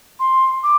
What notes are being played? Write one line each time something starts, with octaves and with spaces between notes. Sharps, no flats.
C6
D6